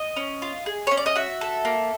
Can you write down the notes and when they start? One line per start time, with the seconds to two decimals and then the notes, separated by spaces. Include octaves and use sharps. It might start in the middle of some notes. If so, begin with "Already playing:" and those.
Already playing: D#5
0.16 C#4
0.42 F4
0.66 G#4
0.87 C#4 C#5
0.97 D5
1.06 D#5
1.16 F#4 E5
1.41 A4
1.65 A#3